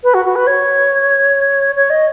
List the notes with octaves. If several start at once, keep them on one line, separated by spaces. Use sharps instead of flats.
B4
F#4
F#4
B4
C#5
C#5
D#5